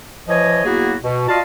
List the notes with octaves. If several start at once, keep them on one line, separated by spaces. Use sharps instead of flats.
E3 F3 C#5 D#5
F#3 A#3 B3 E4 F#4 G#4
B2
F4 F#4 D5 D#5 F5 A5